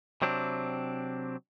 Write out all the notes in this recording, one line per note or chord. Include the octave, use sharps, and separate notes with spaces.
C3 F#3 C4 D4